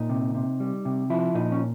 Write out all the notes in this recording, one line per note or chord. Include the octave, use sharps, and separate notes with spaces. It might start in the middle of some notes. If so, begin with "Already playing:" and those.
Already playing: A#2 D#4
C3
C3
G3
C3
F3 E4
A#2 D#4
C#4